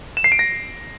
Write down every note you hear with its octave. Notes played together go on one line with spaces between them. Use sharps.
E7
C7
D7
A#6